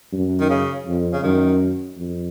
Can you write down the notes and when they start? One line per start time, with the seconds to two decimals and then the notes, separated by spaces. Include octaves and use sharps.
0.13 F#2
0.40 D#3
0.50 C#3
0.86 F2
1.13 C#3
1.23 F#2 D#3
1.97 F2